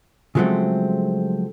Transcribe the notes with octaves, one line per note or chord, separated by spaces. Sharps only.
C#3 F3 F#3 G#3 A3 C4